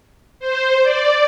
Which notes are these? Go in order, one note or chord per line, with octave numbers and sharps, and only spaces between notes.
C5
D5